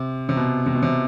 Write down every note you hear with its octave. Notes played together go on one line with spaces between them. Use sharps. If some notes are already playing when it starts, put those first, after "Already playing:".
Already playing: C3
C3
B2
C3
B2
C3